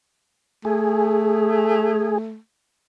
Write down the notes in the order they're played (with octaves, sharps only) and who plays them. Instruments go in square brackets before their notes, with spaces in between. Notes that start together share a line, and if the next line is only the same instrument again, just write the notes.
[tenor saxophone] A3 [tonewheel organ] G#4